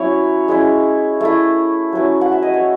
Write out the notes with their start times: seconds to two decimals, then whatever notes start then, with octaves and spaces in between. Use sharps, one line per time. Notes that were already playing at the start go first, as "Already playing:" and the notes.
Already playing: F#3 C#4 E4 C#5
0.48 G#3 C#4 E4
1.21 A3 E4
1.93 F#3 C#4 E4
2.21 F#5
2.32 E5
2.42 D#5
2.54 C#5